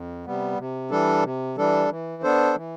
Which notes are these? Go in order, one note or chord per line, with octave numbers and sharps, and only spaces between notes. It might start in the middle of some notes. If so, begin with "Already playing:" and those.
Already playing: F2
C3 G3 B3
C3
E3 G3 D4 A4
C3
E3 G3 D4 A4
E3
B3 D4 A4 C5
E3